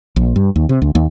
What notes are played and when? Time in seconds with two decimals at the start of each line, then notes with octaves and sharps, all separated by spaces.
0.16 A#1
0.36 G2
0.56 D#2
0.69 C3
0.82 D2
0.95 D#2